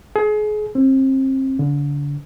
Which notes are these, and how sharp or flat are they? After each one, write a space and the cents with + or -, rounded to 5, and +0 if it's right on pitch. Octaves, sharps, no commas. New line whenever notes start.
G#4 +30
C4 +30
D3 -35